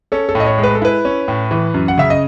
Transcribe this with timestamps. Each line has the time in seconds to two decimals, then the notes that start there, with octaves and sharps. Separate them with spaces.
0.12 C#4 A4
0.29 A4
0.35 A2
0.40 D#5
0.46 C#5
0.58 G#3
0.63 B4
0.75 A4
0.82 E4 B4
1.05 C#4
1.28 A2
1.51 E3
1.74 F#2
1.88 F#5
1.98 C#3 E5
2.10 D#5